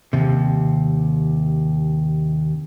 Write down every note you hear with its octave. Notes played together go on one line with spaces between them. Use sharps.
D#2 C3